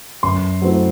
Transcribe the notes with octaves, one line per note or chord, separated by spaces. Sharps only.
F#2 C6
F#3 A3 C4 E4